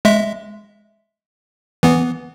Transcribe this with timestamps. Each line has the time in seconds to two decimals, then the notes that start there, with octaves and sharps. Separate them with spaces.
0.05 G#3 E5
1.83 E3 B3